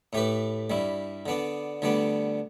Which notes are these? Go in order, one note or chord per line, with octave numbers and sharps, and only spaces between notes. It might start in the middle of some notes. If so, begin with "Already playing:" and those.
A2 A3 G4 B4
G2 G3 E4
D3 B3 D4
D2 D3 G3 B3 D4